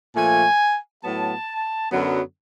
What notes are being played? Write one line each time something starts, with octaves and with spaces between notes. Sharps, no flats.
A#2 F3 A3 G#5
A2 F#3 B3 A5
F#2 D3 F#3 B3